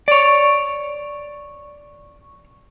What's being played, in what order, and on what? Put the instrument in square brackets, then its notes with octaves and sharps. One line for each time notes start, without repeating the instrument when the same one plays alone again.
[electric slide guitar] C#5 D5